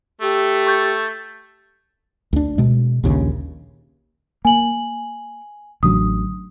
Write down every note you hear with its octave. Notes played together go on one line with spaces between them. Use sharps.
A3 G4
C#6 G6 A6
D2 D4
B2 G#3
A#1 D#2 C#3
A#3 G#5 F#7
A1 D3 F#3 D#6